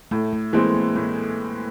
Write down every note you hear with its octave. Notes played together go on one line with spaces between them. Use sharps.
A2 A3
A3
E3 G#3 A#3 C4
A#3
A2 A3